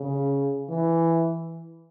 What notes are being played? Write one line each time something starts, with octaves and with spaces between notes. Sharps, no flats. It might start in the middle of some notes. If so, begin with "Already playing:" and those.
Already playing: C#3
E3